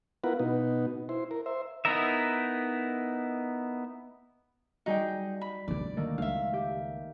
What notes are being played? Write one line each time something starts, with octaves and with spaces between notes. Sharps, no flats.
B3 E4 F4 A#4 B4 F#5
B2 B3 D#4 F#4
E4 C5
A#4
C5 E5
B3 D#4 E4 A#4 E5
G3 D#4 F#4 G#4 G5
B5
D2 B2 D5
D#3 A3 A#3
C#2 E5 F5
G4